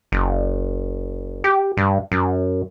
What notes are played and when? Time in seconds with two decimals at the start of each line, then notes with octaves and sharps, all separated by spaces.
0.12 F#1
1.44 G4
1.77 G2
2.12 F#2